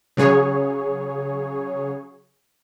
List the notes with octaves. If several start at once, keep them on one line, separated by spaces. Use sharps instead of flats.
C#3 F#3 G#4 C#5